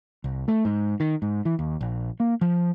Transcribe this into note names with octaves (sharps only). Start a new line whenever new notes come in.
C2
A3
G#2
D#3
G#2
E3
D#2
A#1
A#3
F3